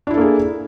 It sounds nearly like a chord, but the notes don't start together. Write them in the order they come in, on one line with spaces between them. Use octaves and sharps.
D4 E4 A4 A#3 G#4